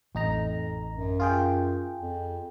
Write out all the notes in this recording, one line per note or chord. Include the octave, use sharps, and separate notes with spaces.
A1 F2 D#4 A#5
F#2
F4 G#4 G5
F2